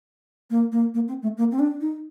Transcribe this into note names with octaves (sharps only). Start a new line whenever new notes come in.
A#3
A#3
A#3
C4
A3
A#3
C4
D4
D#4